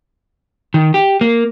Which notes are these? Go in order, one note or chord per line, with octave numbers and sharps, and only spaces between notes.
D#3
G4
A#3